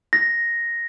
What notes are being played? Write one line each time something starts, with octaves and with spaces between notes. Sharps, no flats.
A#6